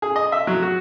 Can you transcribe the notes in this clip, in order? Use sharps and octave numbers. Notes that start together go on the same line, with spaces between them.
G#4
D#5
E5
F#3
F#4